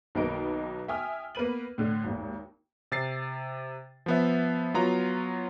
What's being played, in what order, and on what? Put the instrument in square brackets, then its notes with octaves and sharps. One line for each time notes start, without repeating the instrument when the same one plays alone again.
[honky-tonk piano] B1 D#3 A#3 D#4 B4 D7
E5 G5 G#5 D#6 F6
A#3 B3 B4 D#7 F#7
A2 D3
G#1 D#2
[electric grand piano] C3 A6 C7
F3 B3 E5
F#3 B3 F4 A#5